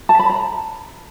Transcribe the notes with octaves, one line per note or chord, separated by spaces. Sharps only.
A5
B5
A#5